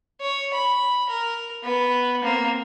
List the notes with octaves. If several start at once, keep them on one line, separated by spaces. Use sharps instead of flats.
C#5
B5
A#4
B3 B4
A#3 C4